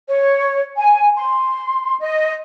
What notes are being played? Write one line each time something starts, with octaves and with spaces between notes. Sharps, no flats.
C#5
G#5
C6
D#5